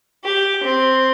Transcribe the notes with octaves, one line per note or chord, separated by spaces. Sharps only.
G4
C4